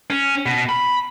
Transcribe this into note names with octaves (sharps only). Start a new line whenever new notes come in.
C#4
B2
B5